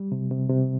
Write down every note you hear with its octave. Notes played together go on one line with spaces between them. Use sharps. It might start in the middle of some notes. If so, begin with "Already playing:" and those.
Already playing: G3
C3
C3
C3